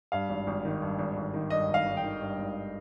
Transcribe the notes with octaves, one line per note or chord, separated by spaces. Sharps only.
G2 F5
G#1
G#1
D#3
G2
G#1
G#1
D#3
G2 D#5
G#1
F5
G#1
G5
D#3
G2
G#1